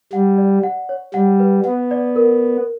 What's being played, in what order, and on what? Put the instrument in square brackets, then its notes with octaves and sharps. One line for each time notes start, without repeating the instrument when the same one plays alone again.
[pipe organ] G3 [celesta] F#5
[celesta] D5
F#5
C#5
[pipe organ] G3 [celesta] F#5
[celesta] B4
[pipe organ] B3 [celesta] F#5
[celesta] D5
A#4